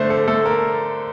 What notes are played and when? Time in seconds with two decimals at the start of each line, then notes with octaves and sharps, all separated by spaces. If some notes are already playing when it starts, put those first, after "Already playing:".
Already playing: D3 A3 C5
0.10 A4
0.28 A3 A4
0.45 A#4